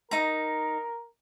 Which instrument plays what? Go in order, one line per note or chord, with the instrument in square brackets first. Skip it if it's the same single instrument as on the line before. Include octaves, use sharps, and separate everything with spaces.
[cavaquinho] D#4 A#5 [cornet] A#4